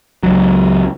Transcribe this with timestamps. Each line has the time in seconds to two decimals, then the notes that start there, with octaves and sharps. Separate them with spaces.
0.23 C#2 F#3